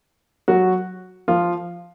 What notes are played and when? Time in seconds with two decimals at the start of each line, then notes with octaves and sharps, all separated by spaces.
0.48 F#3 F#4
1.28 F3 F4